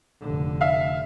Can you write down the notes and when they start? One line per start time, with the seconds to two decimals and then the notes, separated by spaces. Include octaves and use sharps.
0.22 F1 D3
0.61 E5 F5